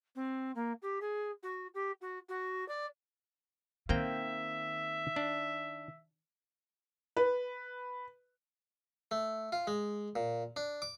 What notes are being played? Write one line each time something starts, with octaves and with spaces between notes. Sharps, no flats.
C4
A#3
G4
G#4
F#4
G4
F#4
F#4
D5
D#3 A#3 C4 E5 G5
D4
B4
A3
F4
G#3
A#2
D4
D6